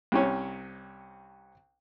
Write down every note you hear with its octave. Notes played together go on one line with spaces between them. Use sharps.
C2 C3 C#4